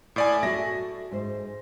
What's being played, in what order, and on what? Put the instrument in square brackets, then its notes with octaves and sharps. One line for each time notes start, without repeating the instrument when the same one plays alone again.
[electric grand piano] A2 D5 G#5
[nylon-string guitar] F#4 A4 E5 [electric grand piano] A#6
[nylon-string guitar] G#2 C5